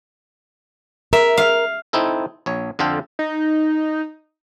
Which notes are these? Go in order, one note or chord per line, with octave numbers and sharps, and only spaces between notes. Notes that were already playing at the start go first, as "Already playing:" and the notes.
A#4 E5
F5
C4 D#4 E4 A4
A#1 C#5
F2 D3 F4 A4 G5
D#4